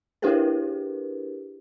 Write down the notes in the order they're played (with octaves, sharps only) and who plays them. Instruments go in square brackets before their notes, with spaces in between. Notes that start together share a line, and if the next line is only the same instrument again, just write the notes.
[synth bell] D4 E4 G4 G#4 A#4 B4